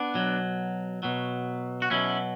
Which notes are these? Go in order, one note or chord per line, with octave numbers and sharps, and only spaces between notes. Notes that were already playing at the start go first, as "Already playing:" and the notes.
Already playing: B3 D4
B2 F#3
B2 F#3
F#4
B2 F#3 C#4 E4